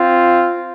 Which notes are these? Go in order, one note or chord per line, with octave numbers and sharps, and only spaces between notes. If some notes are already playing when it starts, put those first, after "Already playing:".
Already playing: C4 F4